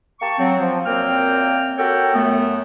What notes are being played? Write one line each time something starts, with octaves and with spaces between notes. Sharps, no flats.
A#3 G4 A5 C#6
F#3 C4
F3
F#2 A#2 A#3 C4 G5 F6
F#4 G4 A4 A#4 C#5 G5
F#2 A3 B3